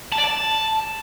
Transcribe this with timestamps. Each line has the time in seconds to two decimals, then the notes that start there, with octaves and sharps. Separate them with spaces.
0.12 A5
0.18 D5
0.24 A5